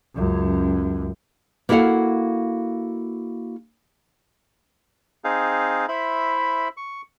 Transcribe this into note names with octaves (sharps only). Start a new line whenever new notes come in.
C#2 F#2
A#3 E4 F#4 A4 F5 F#5
C4 D#4 G#4 F5
E4 C5 E5 B5
C#6